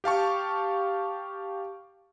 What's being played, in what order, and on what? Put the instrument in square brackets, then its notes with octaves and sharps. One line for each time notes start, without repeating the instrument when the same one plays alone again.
[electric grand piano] G4 F5 A5 C#6